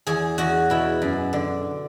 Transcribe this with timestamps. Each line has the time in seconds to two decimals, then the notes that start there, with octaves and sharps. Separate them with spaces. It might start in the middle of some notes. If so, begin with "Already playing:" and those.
0.07 E2 G#4
0.38 E2 F#4
0.70 B2 E4
1.02 F#2
1.33 D3